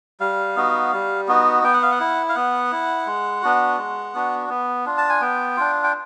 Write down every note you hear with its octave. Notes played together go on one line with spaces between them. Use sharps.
G3 F5
B3 D#4 F#4
G3
B3 D#4 F#4
B3 G5
F#5
F5
F#5
E4
F5
B3 F#5
E4
G#3
B3 D4 F#4
G#3
B3 D4 F#4
B3
D4 F4
A5
G#5
B3 G5
D4 F4
G5